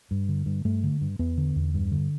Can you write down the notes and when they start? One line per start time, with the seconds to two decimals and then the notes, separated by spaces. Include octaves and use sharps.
0.11 G2
0.29 D3
0.46 G2
0.65 G2 A3
0.83 D3
1.01 G2
1.19 E2 B3
1.38 D3
1.56 E2
1.74 G2
1.91 D3